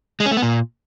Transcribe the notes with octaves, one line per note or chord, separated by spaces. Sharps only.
G#3
C#4
A3
B3
A#2